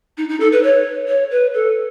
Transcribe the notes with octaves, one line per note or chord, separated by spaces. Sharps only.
D#4
D#4
A4
B4
C#5
C#5
B4
A4